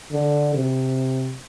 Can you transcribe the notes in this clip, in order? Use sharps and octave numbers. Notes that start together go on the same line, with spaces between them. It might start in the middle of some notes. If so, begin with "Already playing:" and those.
D3
C3